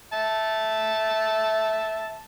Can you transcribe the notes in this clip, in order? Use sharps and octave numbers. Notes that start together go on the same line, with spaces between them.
E5 A5